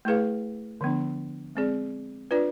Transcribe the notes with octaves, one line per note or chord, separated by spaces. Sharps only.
A3 E4 G#4 B4 F5
D3 F3 B3 D4
G#3 C4 G#4 D5
D4 F4 B4 D5